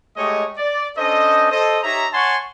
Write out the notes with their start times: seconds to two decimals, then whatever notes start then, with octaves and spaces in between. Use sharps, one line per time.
0.16 G#3 A3 G4 C#5 D#5
0.57 D5
0.97 C#4 D4 A4 C5 D#5
1.50 A4 C5 D#5
1.83 D#4 G4 C#5 E5 A#5
2.13 C#5 F#5 G#5 A5 C6 C#6